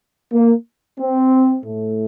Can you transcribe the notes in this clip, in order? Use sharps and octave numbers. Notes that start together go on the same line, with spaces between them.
A#3
C4
A2 A3